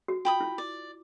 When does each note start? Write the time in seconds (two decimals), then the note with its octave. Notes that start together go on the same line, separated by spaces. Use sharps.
0.08 F#4
0.25 F4 G5 B5 D#6
0.41 E4
0.58 D5